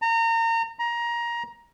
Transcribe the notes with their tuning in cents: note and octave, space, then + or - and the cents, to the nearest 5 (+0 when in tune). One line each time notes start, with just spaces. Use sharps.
A#5 -30
A#5 +20